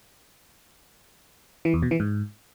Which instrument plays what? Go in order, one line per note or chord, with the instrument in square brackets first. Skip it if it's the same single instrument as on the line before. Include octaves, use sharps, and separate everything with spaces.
[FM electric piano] E3
E2
B2
E3
G#2